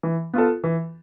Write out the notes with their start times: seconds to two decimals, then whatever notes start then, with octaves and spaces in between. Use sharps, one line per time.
0.03 E3
0.33 B3 F4 A4
0.64 E3